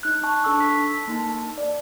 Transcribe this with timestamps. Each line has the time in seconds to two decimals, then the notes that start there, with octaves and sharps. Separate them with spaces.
0.03 D#4 F#6
0.24 A5 C#6
0.44 D4 A4 A5 C#6 E6
0.60 B6
1.08 A#3 D#4 A5
1.58 D5